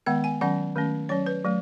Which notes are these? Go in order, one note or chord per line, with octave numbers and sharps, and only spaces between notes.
D#3 G#3 B3 F#5
G#5
D#3 F#3 C#4 F#5
D#3 A3 C#4
F#3 C#4 C#5
B4
F#3 A3